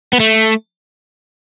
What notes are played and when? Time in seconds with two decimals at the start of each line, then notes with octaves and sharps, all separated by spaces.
0.13 B3
0.20 A3